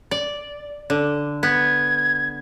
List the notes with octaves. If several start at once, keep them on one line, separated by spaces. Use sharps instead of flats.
D5
D3
B3 G#6